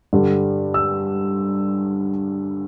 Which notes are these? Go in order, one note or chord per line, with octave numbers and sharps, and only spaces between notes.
G2 D3 G3
E6